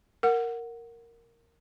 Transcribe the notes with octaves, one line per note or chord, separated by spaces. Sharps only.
A#4 F#5